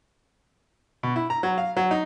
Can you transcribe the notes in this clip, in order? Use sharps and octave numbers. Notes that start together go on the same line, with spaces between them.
B2
E4
A#5
F#3
F5
F#3
D#4